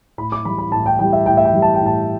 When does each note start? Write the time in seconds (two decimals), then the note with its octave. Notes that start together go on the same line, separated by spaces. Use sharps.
0.18 A2 B5
0.32 D6
0.45 E3 G3 B5
0.58 B5
0.72 A2 A5
0.86 G5
0.99 E3 G3 G5
1.13 E5
1.26 A2 G5
1.37 E5
1.45 G5
1.53 E3 G3
1.62 A5
1.74 G5
1.80 A2
1.86 A5